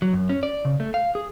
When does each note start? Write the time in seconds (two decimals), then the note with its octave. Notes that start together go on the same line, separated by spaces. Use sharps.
0.02 F#3
0.13 F#2
0.29 C#4
0.43 D5
0.65 C#3
0.80 A3
0.94 F5
1.15 G#4